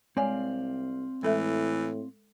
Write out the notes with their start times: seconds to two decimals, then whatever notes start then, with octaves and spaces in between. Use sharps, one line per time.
0.17 C2 G#3 C4 C#5 D5 F5 G#5
1.23 A2 E3 G#3 A4 E5